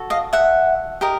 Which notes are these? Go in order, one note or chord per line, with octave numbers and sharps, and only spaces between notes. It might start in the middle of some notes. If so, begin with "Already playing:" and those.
Already playing: F#4 A4
D#5 F5
E5 F#5
G4 A#4 D#5